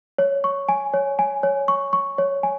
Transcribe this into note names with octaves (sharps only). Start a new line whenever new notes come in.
C#5
C#6
G#5
C#5
G#5
C#5
C#6
C#6
C#5
G#5